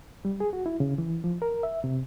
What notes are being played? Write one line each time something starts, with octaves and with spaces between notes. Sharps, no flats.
G3
G#4
F#4
E4
C#3
E3
F3
A#4
E5
C3